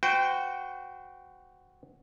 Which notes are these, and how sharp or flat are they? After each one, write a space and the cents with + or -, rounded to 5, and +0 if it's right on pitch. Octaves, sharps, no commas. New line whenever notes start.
F#4 +0 C5 -35 G5 +0